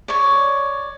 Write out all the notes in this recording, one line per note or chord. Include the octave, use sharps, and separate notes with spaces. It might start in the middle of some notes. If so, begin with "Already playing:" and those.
C#5 D5